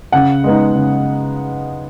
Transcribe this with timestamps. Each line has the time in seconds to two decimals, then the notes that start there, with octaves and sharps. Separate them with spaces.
0.12 C#3 F#5
0.44 G#3 B3 D#4
0.76 C#3